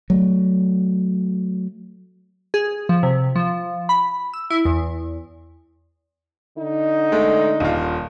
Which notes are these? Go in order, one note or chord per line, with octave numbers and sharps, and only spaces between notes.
F#3 A3
G#4
F3
C3
F3
B5
E6
E4
E2
D3 D#4
G#3 A3
D#1 F4